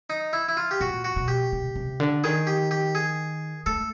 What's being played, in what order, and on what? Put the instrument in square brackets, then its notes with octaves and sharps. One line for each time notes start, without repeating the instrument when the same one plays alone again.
[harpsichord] D#4
E4
E4
F4
G4
[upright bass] A#2 [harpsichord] F#4
[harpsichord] F#4
[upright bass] B2
[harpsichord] G4
[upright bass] C3
C3
D3
[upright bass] D#3 [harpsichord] G#4
[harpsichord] G4
G4
G#4
[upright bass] A3 [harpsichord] A4